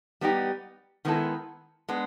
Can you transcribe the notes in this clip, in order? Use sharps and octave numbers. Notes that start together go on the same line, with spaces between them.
G3 B3 D#4 G4
D#3 G#3 B3 E4 A4
G#3 B3 D4